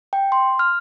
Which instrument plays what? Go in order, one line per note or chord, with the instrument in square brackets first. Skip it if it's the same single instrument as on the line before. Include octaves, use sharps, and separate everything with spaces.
[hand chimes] G5
C6
F6